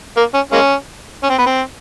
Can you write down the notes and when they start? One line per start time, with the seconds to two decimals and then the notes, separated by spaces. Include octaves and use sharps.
0.17 A#3
0.34 C#4
0.52 G#3 A#3 C#4
1.23 C#4
1.30 C4
1.38 B3
1.46 C4